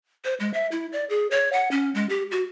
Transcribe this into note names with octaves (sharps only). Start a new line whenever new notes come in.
C5
G#3
E5
E4
D5
G#4
C#5
F#5
C#4
G#3
G4
F#4